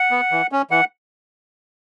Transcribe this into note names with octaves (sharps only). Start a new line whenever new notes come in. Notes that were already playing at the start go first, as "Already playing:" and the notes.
Already playing: F#5
B3
E3
C#4
E3 F#5